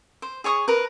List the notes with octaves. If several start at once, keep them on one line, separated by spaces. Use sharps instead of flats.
C5
G#4 C#5 C#6 D#6
A#4 B4